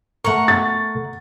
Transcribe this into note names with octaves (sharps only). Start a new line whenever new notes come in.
A3 A#4 F#5 A#5 C#6
A6